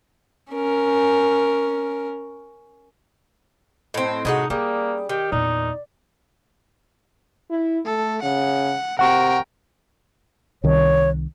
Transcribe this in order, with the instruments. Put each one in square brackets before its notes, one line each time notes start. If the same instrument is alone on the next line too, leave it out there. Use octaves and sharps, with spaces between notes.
[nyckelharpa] C#4 A#4
[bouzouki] A2 C4 [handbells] D#5
[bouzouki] A2 G#3 F#4 [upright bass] C3 [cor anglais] D#4
[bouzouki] G3 [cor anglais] A#3 [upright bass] C#4 [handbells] G#4 G5 D#6
[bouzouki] D#3 [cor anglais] G4
[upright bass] E2 A#2 [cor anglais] D#4 [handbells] D5
[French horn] E4
[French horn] A3 [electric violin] A4
[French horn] C#3 [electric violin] F#5
[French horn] C3 [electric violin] A#4 G5 [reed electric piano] F#5 C#6
[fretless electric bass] C2 D#3 [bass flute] C#5